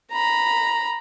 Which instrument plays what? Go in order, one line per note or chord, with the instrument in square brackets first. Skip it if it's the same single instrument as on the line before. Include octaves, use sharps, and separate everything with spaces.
[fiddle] A#5 B5